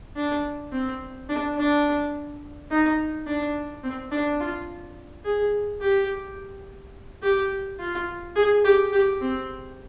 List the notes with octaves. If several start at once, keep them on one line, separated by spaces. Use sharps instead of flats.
D4
C4
D4
D4
D#4
D4
C4
D4
F4
G#4
G4
G4
F4
G#4
G4
G4
C4